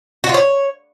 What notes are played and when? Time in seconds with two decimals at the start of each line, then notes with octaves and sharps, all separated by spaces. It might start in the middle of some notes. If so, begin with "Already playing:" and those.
0.24 F#4
0.29 F4
0.34 C#5